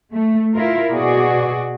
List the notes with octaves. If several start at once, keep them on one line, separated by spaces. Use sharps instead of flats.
A3
E4 F4 A#4
B2 F#4 G#4 D5